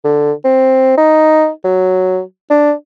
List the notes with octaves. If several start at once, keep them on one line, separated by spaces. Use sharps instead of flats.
D3
C4
D#4
F#3
D4